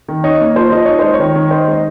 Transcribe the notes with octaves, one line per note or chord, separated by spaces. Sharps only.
D#3
D#4 C#5
A#3
F3 C5
F3 D#5
D#4 C#5
G#3 C5
C#5
D#3
D#3
D#4 C5
G#3 D#5